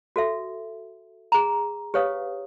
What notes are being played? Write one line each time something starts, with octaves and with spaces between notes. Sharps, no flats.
F#4 A4 E5
G#4 A#5
G4 B4 C#5 F5 D#6